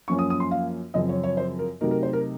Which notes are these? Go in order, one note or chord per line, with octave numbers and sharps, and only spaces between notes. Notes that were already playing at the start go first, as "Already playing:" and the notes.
F#2 F3 A#3 C#4 C#6
D#6
D#6
C6
F5
F#2 C#3 F3 C4 D#5
C#5
C#5
C5
A#4
C3 F#3 A3 D#4 A#4
A#4
C5
A#4